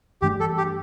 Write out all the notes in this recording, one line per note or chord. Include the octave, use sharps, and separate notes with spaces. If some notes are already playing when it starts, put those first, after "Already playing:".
G2 E3 A3 D4 G4
A4
G4